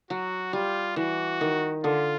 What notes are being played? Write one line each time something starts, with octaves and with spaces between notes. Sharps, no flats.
F#3 F#4
G3 F4
E3 F#4
D#3
D3 F4